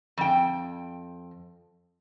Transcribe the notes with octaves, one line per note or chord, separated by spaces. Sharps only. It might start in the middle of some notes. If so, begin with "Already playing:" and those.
F2 G5